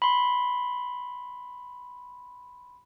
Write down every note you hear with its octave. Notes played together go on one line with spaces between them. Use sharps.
B5 C6